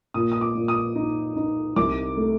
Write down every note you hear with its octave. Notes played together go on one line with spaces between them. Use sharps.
A#2 D#6
D#6
D6
A#2
D#6
D#4
D#4
C2 D6
A3